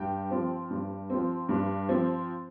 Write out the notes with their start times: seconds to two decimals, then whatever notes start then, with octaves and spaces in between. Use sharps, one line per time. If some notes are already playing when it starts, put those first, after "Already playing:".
Already playing: G2 G5
0.31 F3 C4
0.70 G2
1.10 F3 C4
1.49 G2
1.89 F3 C4